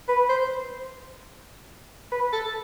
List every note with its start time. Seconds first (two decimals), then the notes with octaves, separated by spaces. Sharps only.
0.09 B4
0.29 C5
2.12 B4
2.33 A4